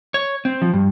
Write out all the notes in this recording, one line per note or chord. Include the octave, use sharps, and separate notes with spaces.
C#5
C4
F3
G2